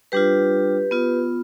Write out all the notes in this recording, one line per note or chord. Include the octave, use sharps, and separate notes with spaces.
G3 D4 F4 G4 B4
B3 F4